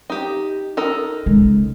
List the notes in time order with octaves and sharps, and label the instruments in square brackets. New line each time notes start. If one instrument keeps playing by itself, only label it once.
[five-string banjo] D#4 G4
D#4 A4 A#4
[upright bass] C#3 G#3